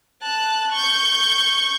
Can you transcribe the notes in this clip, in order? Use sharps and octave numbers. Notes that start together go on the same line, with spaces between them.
A5 F#6
C#6 G6